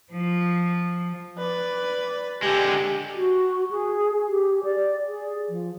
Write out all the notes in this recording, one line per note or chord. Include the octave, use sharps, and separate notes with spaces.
F3
B4 D5
D3 G#3 G4 G#5
F#4
G#4
G4
D5
G#4
F3